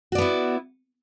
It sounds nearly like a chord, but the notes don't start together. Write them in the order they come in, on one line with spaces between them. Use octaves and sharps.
F#4 D5 B3 E4